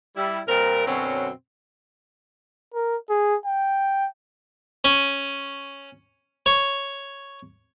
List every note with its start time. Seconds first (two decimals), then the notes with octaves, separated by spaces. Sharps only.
0.17 G3 E4
0.48 A#2 G3 C4 A#4
0.86 F#2 B2 D3 F#3 C4 C#4
2.74 A#4
3.10 G#4
3.46 G5
4.84 C#4
6.46 C#5